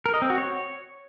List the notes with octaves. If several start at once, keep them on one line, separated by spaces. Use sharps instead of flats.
A#4
D#5
C4
F#4
C#5